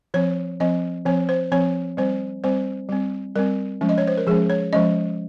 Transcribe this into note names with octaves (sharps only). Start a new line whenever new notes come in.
F3 C4 C#5
F3 C4 D#5
F3 C4 C#5
C5
F3 C4 C#5
G3 C4 C5
G3 C4 C5
G3 C4
G3 C4 A#4
F3 G#3 C#4
D#5
C#5
C5
A#4
F3 G#3 C#4 G#4
C#5
F3 G#3 C#4 D#5